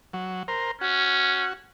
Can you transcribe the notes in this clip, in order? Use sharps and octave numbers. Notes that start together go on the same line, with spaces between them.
F#3
A#4 C5
C#4 F#4